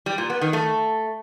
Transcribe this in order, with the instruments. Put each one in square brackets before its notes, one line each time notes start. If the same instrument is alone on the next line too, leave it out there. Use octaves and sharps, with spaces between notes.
[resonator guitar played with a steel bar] G3
A#2
B3
D#3
A3